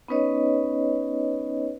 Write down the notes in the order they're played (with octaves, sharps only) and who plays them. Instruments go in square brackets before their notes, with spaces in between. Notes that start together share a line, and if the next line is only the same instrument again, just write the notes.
[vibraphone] B3 C#4 D#4 B4 C#5 D#5